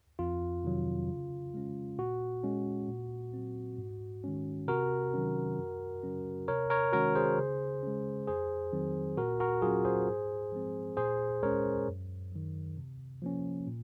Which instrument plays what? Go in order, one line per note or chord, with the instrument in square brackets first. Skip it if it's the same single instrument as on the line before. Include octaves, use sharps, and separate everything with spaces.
[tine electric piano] F2 F4
C3 D#3 F#3
C#3
G#3 C#4
A#2 F#4
G#3 C#4
A#2
F#3 C4
G#2
D#3 G#3 C#4
C3 F#4 A#4
D#3 F#3 C#4
F#2
C#3 F#3 C#4
C3 A#4 C#5
A#4 C#5
D#3 G#3 C#4 F#4 A#4
G#4 C5
C#3
G#3 C#4
F2 G#4 C5
D#3 F#3 C4
A#2 F#4 A#4
F#4 A#4
F#3 C#4 F4 G#4
G#4 C5
G#2
F3 G#3 C4
A#2 G#4 C5
G#3 C#4 A#4 C#5
F#2
D#3 F#3
C3
F3 A#3 C#4
A#2